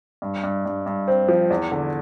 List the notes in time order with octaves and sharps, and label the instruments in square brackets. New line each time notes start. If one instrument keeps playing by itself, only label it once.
[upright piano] G2
G2
G2
G2
C4
F3
E2
D3